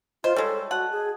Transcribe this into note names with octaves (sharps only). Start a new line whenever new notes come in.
F4 C5 D#5
G3 G#3 A4 C#5
F#4 F#5 A5
G#4